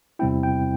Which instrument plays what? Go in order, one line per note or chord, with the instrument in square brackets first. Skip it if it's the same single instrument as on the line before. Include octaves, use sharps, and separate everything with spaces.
[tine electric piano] E2 C3 G3 C4 E4 G5
G5